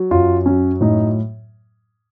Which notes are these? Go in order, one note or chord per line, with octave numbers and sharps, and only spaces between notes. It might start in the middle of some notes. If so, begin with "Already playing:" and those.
Already playing: F#3
F#2 F4
F#3 C#4
A2 D#4